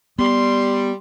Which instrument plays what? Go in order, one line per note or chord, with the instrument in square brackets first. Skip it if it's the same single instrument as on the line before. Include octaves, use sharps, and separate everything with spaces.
[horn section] G3 [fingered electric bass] B3 [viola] C6